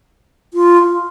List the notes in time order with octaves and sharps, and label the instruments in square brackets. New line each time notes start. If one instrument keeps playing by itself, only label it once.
[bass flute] F4